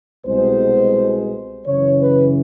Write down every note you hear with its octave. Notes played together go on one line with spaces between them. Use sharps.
C2 B2 G#3 C5
F#2 C#3 E3 C#5
B4